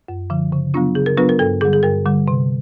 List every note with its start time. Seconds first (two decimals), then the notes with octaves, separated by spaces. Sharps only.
0.08 F#2
0.30 D3 F3
0.52 C#3
0.74 F#3 B3 D4 F4
0.95 C#3 G#4
1.06 A#4
1.17 F#3 B3 D4 F4 B4
1.29 A#4
1.39 G2 A4
1.61 D3 G3 G#4
1.73 G#4
1.83 G2 A#4
2.06 D3 G3
2.28 C3